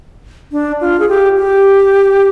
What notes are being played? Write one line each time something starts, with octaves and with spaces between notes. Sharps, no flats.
D4
F4
G#4
G4
G4